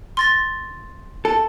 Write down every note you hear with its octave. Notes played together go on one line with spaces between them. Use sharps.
C6 A6 A#6
A4